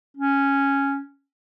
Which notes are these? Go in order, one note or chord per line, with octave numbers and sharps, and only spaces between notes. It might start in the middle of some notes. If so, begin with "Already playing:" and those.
C#4